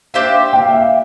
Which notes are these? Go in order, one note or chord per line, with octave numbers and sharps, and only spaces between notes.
D4 G4 C5 E5 F5
G5
F5
E5
F5